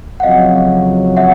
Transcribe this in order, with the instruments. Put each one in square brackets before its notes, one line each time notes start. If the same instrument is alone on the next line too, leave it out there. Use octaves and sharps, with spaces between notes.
[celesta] F#5
[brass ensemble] F2 C#3 F#3 [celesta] D#5 F5
[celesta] E5 F#5